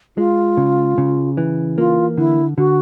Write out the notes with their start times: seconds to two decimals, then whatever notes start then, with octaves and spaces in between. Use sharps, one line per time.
0.17 G#3 F4
0.57 C#3
0.98 C#3
1.37 E3
1.78 A#3 F4
2.18 D3 E4
2.58 D3 F#4